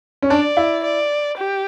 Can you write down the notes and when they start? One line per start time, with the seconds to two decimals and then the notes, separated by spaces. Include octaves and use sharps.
0.22 C#4
0.30 D4 D5
0.57 E4
0.84 D5
1.37 G4